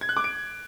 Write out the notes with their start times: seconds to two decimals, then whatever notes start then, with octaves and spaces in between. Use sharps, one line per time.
0.01 G#6
0.09 F#6
0.17 D6
0.24 D7